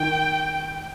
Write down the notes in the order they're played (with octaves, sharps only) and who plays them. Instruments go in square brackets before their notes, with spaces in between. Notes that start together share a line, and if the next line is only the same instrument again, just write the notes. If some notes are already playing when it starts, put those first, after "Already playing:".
Already playing: [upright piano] D#3 [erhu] G5